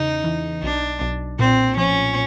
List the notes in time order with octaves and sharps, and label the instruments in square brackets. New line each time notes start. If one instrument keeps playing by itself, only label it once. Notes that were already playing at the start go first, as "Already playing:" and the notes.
Already playing: [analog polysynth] E2 C#3 [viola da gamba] D#4
[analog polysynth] E3
[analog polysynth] B1 [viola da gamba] D4
[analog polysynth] B1
[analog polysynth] A#2 [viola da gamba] C4
[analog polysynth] F3 [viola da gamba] C#4